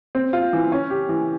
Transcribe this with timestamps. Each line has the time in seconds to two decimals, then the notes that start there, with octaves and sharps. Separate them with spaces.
0.15 C4
0.33 F4
0.53 E3
0.72 C#4
0.90 G4
1.09 E3